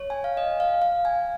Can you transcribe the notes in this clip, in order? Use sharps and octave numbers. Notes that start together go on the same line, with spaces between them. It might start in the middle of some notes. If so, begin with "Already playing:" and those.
Already playing: C#5
G#5
F5
D#5
F5
F5
G#5